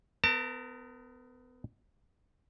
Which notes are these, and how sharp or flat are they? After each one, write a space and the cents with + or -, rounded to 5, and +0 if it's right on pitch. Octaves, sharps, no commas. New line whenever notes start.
B3 +30 A#4 -10 A5 +35